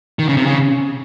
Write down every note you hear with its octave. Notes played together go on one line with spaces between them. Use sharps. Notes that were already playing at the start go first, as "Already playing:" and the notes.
D#3
C#3
C3
C#3